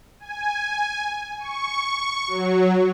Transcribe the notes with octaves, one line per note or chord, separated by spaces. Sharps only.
G#5
C#6
F#3